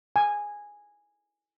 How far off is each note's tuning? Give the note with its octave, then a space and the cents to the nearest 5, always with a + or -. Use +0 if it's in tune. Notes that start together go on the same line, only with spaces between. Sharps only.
G#5 -5